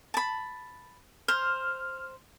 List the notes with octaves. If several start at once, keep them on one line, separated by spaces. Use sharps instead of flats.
A5 B5
C5 F6